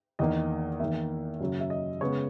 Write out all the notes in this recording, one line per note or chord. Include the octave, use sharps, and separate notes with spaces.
E2 D#3 A#3 D#5
E2 D#3 A#3 E5
F#2 C#3 F#3
E5
D#5
C#3 G#3 B3 C#5